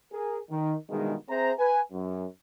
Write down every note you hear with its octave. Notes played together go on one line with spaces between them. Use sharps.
G#4 A#4
D#3
G2 B2 D#3 E3 G#3
C4 G#4 C5 E5 A#5
B4 G#5
F#2